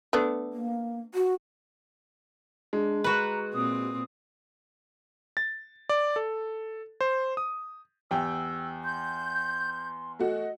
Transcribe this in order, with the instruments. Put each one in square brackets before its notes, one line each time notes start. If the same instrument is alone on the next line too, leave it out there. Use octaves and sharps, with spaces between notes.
[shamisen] A3 B3 D4
[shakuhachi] A#3
F#4
[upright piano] G#3 [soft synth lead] D4
[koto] F#4 B4 [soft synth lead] A#5
[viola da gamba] A#2 C4 [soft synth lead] D#6
[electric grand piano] A6
D5
A4
C5
D#6
[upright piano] E2 G4 G5 [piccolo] E6
[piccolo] C6 [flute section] G6
[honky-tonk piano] A3 F#4 [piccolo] D#5